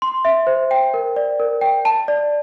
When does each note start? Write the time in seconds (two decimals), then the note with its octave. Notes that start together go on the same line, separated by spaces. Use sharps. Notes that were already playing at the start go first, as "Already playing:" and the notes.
0.02 C6
0.25 E5
0.47 C5
0.71 G5
0.94 A#4
1.16 D5
1.40 A#4
1.61 G5
1.85 A5
2.08 D5